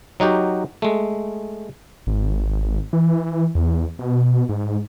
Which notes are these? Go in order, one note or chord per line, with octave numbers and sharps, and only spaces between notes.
F#3 D#4 F#4 G4
G#3 A3
G#1
E3
E2
B2
G#2